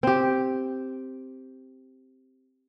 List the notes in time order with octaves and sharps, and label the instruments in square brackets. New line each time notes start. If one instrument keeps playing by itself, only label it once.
[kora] C4 G4